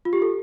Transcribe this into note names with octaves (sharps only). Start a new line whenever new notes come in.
F4
G4
A4